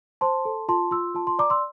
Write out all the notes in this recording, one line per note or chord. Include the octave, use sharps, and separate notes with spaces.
C5 A5 C6
A4
F4 A5 C6
F4 C6 E6
F4 A5 C6
A5 C6
D5 A#5 D6
C6 E6